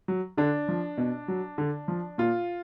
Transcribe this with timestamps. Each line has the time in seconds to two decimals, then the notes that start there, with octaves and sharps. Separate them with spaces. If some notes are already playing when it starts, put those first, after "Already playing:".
0.08 F#3
0.37 D3 D4
0.68 F3
0.97 B2
1.28 F#3
1.58 D3
1.88 F3
2.18 A#2 F4